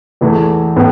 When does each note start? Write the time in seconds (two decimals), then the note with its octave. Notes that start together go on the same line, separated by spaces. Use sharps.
0.21 E2 E3 A3
0.76 A2 B3